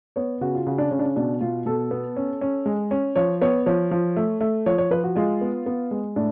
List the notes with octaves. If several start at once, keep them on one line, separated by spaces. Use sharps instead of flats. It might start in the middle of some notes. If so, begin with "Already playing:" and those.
B3 C#5
C#3 F#4
F4
C#3 F#4
D4
C#3 C#4
D4
C#4
B2 D4
B2 F4
B2 A4
B3
C#4
C#4
G#3
C#4
F3 C#5
B3 C#5
F3 C#5
F3
A3
A3
F3 C#5
C#5
F3 B4
F#4
G#3 F4
B3
B3
G#3
A2 D4